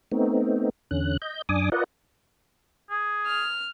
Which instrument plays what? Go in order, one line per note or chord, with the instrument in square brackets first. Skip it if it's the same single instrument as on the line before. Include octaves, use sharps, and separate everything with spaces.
[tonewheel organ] A3 B3 C4 D#4
E2 D3 C#4 F#6
D#5 G6
F#2 D4 G#5 D6 D#6
F4 A#4 B4 D5 D#5 F#5
[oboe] G#4
[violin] F6